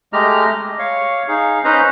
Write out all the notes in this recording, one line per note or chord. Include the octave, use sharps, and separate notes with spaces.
G#3 A3 G4 D#5 A#5 F6
D#5
C#5 F5
D#4 G#4 F5
C#4 D#4 B4 C5 D#5 A#5